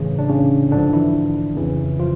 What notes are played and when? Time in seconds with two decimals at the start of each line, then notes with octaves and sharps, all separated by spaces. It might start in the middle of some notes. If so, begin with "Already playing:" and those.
Already playing: A2 C#3 E3 C#4
0.19 D4
0.29 C#3 C#4
0.71 G#2 D3 F3 D4
0.92 E3 E4
1.56 F2 C#3 E3
1.99 F3 F4